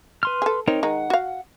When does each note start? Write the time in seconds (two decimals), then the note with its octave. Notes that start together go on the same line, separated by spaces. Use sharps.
0.23 B4 C6 F6
0.42 G#4 A4
0.68 C4 D#4 A#4 C#5
0.83 D#3 G#3 D#4 F#5
1.10 F#4 F5